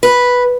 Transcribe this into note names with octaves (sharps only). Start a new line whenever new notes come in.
B4